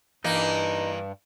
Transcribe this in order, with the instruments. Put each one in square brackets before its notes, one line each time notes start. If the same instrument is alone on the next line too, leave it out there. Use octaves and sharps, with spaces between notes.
[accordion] G2 [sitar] E3 A#3 [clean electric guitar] D#4